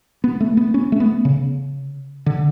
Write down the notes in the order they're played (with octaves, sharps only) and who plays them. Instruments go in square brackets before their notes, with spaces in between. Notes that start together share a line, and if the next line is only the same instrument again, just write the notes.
[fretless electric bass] B3
A3
B3
C#4
A3
B3
C#3
D3